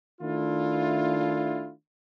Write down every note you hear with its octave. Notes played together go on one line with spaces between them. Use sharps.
D#3 A3 D4 E4 F4